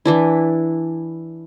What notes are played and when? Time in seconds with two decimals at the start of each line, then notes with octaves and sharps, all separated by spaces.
0.06 E3 D4 E4